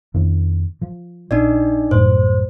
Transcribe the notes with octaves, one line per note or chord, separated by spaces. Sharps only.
F2 D#3 D4
F3
A#1 D4 D#4 D5
C2 F#2 A2 C5